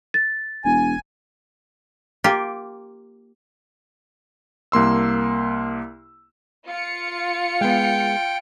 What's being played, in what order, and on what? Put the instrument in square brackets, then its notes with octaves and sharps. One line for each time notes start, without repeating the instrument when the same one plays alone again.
[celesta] A6
[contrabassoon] E1 [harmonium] G#5
[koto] A#3 F4 G4
[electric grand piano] C2 A#3 C6 E6
[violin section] F4 C#7
[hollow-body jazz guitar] G#3 B3 [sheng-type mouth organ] G5